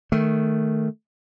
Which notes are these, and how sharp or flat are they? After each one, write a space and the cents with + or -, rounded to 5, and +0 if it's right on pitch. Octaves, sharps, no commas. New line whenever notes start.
D#3 +0 A3 +0